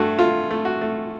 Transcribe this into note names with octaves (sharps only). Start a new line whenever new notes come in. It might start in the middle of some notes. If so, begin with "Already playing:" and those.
Already playing: G2 A3 F#4
A3 F4
A3
F#4
A3